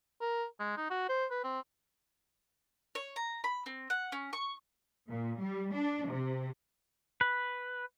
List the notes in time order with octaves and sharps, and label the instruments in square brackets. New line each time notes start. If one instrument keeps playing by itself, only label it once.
[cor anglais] A#4
G#3
D#4
F#4
C5
B4
C4
[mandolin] C#5
A#5
B5
C4
F#5
C#4
C#6
[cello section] A#2
G3
D4
C3
[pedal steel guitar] B4